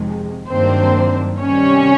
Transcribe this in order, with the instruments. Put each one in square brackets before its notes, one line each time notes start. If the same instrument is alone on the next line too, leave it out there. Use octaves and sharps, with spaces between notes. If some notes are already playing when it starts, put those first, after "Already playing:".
Already playing: [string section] F2 C3 D#3 G#3
G2 D#3 F#3 A#3 C4 D4 C5
C3 D#3 G3 C#4 C#5